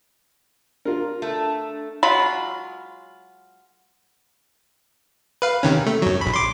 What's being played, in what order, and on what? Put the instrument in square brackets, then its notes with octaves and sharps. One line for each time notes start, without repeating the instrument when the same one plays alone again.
[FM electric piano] D4 [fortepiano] F4 A#4
[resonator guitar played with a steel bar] A3
[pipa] F#3 G#3 F4 B5
[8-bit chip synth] B4 F5
C3 D#3 C#4
A3
F#2 F#3
A#1 B5
C6 D6